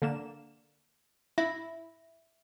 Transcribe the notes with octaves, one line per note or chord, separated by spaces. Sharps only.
D3 A#3 E7
E4 E5 B5